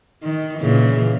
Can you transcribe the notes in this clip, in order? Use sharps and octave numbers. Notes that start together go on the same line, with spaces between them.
D#3
A#2 C#3 E3